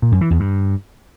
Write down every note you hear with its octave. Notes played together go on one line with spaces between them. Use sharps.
A#2
F#2
E3
E2
G2